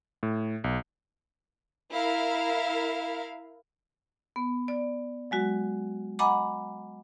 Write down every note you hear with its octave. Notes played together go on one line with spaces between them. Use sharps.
A2
B1
E4 A#4 F5
B3
D5
F#3 G#3 F#4
D#5 F#5 G#5 A#5 B5 D6